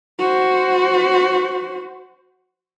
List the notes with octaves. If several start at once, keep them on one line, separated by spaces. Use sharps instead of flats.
F#4 C5